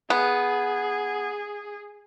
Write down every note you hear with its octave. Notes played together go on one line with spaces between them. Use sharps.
B3 G#4